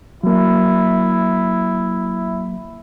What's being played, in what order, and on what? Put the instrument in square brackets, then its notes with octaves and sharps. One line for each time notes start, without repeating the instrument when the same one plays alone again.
[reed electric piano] F#3 A#3 [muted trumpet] E4